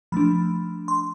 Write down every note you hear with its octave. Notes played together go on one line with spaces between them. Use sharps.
F3 A3 D4 B5
C6